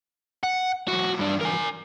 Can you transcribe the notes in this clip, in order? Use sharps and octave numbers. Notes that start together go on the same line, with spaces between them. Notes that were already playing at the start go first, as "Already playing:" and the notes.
F#5
E3 F#3 F#4
G2 D4
A#4 G#5